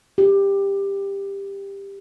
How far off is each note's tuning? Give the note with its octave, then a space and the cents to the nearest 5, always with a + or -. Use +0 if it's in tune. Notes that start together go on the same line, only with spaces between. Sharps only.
G4 +15